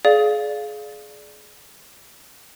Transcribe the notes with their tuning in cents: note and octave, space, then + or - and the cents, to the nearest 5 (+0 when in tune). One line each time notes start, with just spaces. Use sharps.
G#4 +30 D5 +0 F5 +0